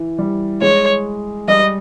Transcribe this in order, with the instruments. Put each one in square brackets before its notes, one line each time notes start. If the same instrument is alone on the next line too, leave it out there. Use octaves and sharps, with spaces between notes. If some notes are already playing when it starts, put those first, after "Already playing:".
Already playing: [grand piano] E3
G3
[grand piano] G#3 [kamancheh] C#5
[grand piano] G3 [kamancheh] D#5